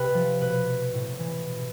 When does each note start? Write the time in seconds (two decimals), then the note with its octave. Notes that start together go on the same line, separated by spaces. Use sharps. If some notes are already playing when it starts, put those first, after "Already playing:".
Already playing: C3 B4
0.14 F3
0.41 B2 B4
0.93 A2
1.19 E3
1.46 B2